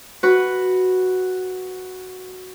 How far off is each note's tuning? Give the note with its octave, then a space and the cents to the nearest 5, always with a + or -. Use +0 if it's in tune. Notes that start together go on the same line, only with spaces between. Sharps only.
F#4 +0 B4 +0